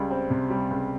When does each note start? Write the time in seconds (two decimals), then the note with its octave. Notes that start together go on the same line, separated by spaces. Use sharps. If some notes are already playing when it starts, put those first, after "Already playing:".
Already playing: C#2 G3
0.11 C4
0.30 C3
0.50 G3
0.71 C#2